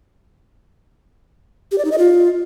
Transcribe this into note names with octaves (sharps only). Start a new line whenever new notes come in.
G4
D5
D#4
D#5
F4